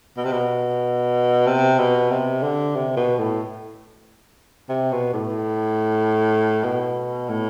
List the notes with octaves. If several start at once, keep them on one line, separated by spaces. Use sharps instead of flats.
B2
C3
B2
C3
B2
C3
D3
C3
B2
A2
C3
B2
A2
B2
A2